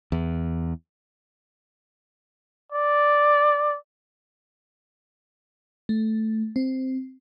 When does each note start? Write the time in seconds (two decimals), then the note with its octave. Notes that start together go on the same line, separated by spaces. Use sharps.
0.12 E2
2.72 D5
5.89 A3
6.56 C4